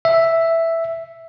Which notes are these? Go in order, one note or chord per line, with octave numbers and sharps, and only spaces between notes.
E5